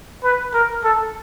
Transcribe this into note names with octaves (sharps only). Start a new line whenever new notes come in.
B4
A#4
A4